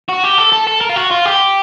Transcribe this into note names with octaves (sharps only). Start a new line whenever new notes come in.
F#4
G4
A4
A4
A4
A#4
F4
F#4
F4
G4